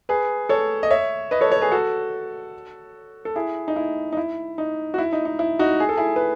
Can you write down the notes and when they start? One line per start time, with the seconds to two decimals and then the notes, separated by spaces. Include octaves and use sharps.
0.09 G#4 B4
0.49 A4 C#5
0.83 D#5
0.90 C#5 E5
1.31 B4 D#5
1.41 A4 C#5
1.51 A4 C#5
1.62 G#4 B4
1.72 F#4 A4
3.25 A4
3.36 E4 G#4
3.68 D#4
3.76 E4
4.13 D#4
4.17 E4
4.58 D#4
4.94 F#4
4.98 E4
5.13 D#4
5.25 D#4
5.39 E4
5.59 D#4 F#4
5.80 G#4
5.89 A4
5.97 E4 G#4
6.16 B4